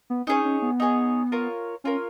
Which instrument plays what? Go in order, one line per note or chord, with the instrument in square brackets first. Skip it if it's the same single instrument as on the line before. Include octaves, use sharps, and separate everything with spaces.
[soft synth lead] B3
[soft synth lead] C#4 [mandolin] D#4 G#4 C#5
[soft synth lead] C#4
B3
[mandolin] D#4 G#4 C#5
F4 A#4 C#5
[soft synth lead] C#4 [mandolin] F4 A#4 C#5